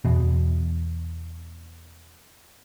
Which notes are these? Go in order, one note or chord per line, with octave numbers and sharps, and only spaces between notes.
E2 B2